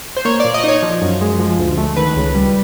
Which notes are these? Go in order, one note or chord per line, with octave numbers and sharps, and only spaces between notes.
C5
A#3 C#5
A#2 D5
D#5
D#4 C#5
F3
F#2
G#3
F3
D2
A3
D#3 B4
C#2
G3